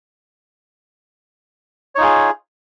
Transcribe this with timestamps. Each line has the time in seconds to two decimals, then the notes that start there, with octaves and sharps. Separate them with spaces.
1.95 C#5
1.98 D#4
2.00 F4
2.03 G#4